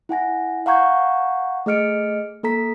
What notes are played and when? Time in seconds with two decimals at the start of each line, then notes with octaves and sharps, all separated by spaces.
0.09 E4 F#5 G#5 A#6
0.66 F5 F#5 A#5 C#6 G6 G#6
1.66 A3 G#4 D#5 F6 C#7 D7
2.43 A#3 A4 A#5 B6